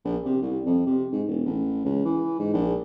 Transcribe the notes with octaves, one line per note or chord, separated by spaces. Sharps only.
A#1
C3
C2
F2
C3
G#2
E1
A1
C#2
E3
G#2
A#1